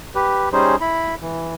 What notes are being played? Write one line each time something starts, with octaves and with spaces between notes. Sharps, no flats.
G4 B4
G3 C#4 D#4 G#4 C5
E4 B5
E3